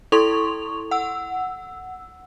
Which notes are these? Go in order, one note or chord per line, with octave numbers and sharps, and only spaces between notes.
E4 A4 C6 C#6 F7
F#5 E6